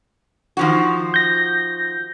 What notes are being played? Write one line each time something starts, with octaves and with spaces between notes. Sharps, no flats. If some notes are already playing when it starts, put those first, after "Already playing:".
D#3 F3 F#4
G6 A#6